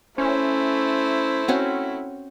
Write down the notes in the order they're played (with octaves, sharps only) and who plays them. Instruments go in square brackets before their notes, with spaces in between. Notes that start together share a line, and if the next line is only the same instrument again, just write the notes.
[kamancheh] A3 E4 [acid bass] C#4 [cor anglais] C5
[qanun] C4 C#4 F#4